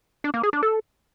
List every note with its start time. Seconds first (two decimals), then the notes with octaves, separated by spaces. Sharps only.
0.24 D4
0.34 A#3
0.43 G#4
0.53 D4
0.63 A4